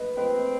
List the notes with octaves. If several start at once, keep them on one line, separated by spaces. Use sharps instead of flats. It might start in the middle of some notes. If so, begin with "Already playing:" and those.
Already playing: B4 D#5
C4 B4 D#5